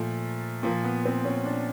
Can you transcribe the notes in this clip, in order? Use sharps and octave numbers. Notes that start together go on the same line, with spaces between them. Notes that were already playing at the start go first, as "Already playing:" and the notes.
Already playing: A#2 F3 A3
A#2 F3 A#3
B3
C4
C#4
D4